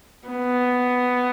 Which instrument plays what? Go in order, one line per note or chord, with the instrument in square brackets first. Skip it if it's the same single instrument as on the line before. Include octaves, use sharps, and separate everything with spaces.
[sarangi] B3